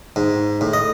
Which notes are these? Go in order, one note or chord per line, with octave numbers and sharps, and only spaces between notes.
G#2
A2
D#5